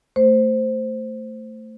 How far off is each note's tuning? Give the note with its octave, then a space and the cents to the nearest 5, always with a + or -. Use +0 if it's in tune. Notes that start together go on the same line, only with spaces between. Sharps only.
A3 +20 C5 +0